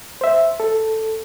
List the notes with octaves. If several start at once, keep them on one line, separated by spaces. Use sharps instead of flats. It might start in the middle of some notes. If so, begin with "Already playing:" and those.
C5 E5
A4